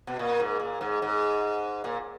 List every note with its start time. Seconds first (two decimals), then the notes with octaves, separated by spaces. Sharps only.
0.07 B2
0.19 A#2
0.40 G#2
0.60 A#2
0.81 G#2
1.02 G#2
1.84 A#2